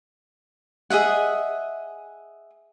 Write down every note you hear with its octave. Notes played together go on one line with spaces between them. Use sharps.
G#4 D#5 E5 F#5